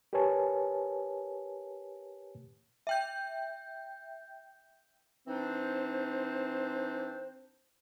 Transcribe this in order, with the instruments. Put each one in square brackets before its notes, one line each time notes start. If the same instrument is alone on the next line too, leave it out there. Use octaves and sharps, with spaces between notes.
[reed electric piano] G4 A#4 B4 C#5 G#5 A5
[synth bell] E5 G5 G6
[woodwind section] E3 C4 D4 D#4 C5